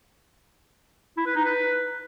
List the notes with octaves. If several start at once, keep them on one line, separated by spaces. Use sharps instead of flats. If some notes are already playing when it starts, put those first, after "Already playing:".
E4
B4
D#4
B4